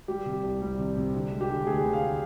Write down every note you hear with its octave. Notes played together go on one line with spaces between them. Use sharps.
G3 G4
C3
C2
G3
C3
C3
D3
G#3
G4
D3
D2 G#4
D2
F5
D3